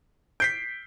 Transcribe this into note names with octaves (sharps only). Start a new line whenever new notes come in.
G6 B6 C7 D7